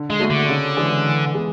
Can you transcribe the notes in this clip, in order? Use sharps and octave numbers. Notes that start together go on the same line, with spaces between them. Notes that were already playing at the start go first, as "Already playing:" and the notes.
Already playing: D3
G#3
A3 D4 F#4 A4
D3
C#3
E3 G#3 D4 G#4
E3
G#3 B3